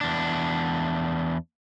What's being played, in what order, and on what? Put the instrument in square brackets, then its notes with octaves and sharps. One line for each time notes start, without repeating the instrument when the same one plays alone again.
[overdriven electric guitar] E2 D4